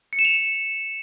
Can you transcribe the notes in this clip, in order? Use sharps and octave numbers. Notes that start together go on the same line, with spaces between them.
C#7
E7
F7